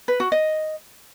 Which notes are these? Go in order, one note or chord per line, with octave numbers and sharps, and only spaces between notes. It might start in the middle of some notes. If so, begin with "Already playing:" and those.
B4
F#4
D#5